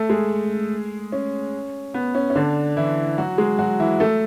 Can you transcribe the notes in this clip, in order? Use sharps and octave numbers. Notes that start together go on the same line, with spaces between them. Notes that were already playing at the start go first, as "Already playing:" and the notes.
Already playing: A3 A4
G#3 G#4
C#4
B3
C#4
C#4
D3 D4
E3 E4
F#3 F#4
G#3 G#4
F#3 F#4
E3 E4
A3 A4